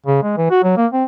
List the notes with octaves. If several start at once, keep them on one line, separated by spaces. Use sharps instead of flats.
C#3
G#3
E3
F#4
F#3
A#3
C4